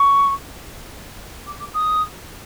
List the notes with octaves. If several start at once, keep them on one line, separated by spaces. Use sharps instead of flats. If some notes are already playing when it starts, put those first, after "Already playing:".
Already playing: C#6
D6
D6
D#6